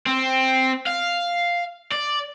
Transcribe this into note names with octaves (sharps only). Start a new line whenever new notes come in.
C4
F5
D5